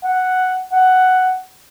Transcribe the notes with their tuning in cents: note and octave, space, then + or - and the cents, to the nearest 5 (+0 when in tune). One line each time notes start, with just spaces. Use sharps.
F#5 +0
F#5 +5